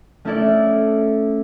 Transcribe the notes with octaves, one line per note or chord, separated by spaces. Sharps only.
A3 C#4 E4 A4 D5